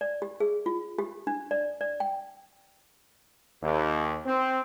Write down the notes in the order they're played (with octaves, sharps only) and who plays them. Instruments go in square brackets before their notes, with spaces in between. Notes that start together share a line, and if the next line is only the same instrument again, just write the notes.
[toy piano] D5
G4
G#4
F4
G4
D4
D5
D5
G5
[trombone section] D#2
C4